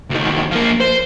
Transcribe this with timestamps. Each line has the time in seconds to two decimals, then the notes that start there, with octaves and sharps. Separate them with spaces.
0.10 D2 D#3
0.51 F3 A#3
0.80 C5